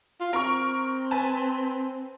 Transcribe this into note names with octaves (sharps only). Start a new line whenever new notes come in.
F4
C4 A#4 C#6
B4 G#5 A5